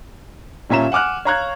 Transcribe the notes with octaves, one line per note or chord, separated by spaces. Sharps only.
D#1 A#2 C#4 E5 A#5 E7
F#5 G#5 D6 F6 F#6
C#5 F5 A#5 C#6 F#6 G#6